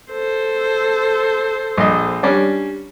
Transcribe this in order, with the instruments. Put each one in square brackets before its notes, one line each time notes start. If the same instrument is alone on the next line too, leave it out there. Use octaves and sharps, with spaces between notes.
[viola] A4 C5
[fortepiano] A#1 D#5
G3 C#4 D4